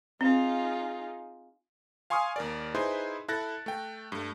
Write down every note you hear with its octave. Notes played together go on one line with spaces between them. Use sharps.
C4 D#4 F4 G#4
F5 G#5 C6 C#6 D#6 F6
D#2 A#4 D5
D#4 E4 G#4 B4 C5 C6
E4 A4 F#6 A6 A#6
A3 G5
G2 A3